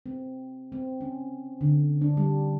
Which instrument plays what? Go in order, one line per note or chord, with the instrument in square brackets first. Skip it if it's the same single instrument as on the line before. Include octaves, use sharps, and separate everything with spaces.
[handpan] C4
C4
C#4
D3
D4
G3